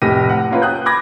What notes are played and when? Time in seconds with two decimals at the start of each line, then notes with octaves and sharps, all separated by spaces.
0.02 F1 A2 G4 A#6 D#7
0.29 F#5
0.50 A#3 C#4 F4 B4
0.62 G5 D#6 F#6 G6
0.86 B5 D6 G#6 A#6